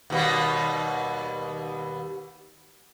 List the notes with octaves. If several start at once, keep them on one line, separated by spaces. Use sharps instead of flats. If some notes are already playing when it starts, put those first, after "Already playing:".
D#2 B2 G3